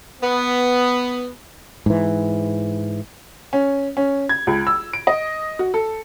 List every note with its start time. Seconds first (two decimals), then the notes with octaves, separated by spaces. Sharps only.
0.22 B3
1.86 G#2 E3
3.53 C#4
3.97 C#4
4.29 G#6
4.47 C#2
4.67 E6
4.93 D7
5.07 D#5
5.59 F#4
5.74 A4